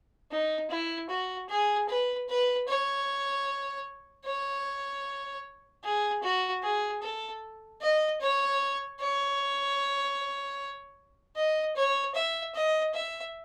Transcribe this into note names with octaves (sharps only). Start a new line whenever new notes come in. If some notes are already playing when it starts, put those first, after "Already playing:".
D#4
E4
F#4
G#4
B4
B4
C#5
C#5
G#4
F#4
G#4
A4
D#5
C#5
C#5
D#5
C#5
E5
D#5
E5